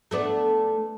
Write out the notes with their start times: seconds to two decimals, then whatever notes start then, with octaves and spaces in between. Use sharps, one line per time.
0.11 A3 B3 D4